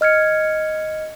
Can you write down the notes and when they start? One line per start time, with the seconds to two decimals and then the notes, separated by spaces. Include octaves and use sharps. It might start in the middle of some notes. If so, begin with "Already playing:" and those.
0.01 D#5 F6 G#6 C#7